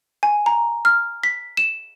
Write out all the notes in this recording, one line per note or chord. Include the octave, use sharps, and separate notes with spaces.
G#5
A#5
F6
B6
E7